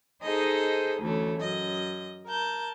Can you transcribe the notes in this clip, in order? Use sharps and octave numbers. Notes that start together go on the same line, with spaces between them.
D#4 G#4 A4 C5 D#5
D2 E3 A3 C#4
F#2 D#5
A#4 A5 G6